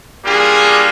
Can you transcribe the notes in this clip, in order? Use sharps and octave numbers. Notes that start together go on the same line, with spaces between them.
G3 A#3 D4 F4 G#4